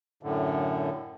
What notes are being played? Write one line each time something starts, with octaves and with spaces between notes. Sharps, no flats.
F#2 A2 D3